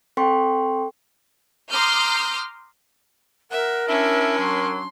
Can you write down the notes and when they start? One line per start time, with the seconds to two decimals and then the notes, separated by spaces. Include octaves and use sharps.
0.17 C4 A4 G5 C6 C#6
1.71 A#5 C6 D6 D#6 F6 G6
3.51 A#4 E5 F#5
3.88 C#4 D4 E4 E5
4.39 F#3 C6